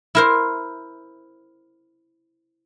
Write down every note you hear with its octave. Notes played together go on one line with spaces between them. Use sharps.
E4 A#4 C5